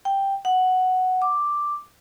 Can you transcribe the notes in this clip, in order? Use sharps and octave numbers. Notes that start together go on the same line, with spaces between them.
G5
F#5
D6